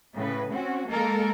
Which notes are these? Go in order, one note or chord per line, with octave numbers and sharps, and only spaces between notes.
A2 C#3 B4
C4 C#4 F#4
G#3 A#3 A4 A#4